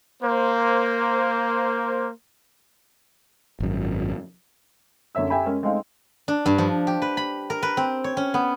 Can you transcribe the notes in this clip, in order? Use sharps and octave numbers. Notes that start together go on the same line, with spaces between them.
A#3 C5
G#1 F#2
F#2 D3 C#5 E5 E6
G4 A4 E5 G5 G#5 B5
G#3 C#4 A#4
G#3 A3 C4 D#4 F5
D4
G2
F3
G4
B4
B5
A#4
B4
C4
C#5
C#4
B3